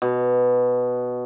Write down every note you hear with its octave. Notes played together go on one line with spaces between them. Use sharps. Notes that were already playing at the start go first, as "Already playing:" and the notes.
B2